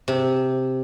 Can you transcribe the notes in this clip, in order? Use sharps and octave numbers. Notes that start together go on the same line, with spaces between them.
C3